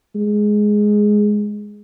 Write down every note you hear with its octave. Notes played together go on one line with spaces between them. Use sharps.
G#3